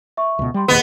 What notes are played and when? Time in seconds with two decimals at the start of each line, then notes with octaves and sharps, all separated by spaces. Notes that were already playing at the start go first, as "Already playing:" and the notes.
0.17 E5 C#6
0.39 C#2 B2
0.54 G3 G5 C6
0.68 F1 D#2 A#2 B3 G#4 B4 D#5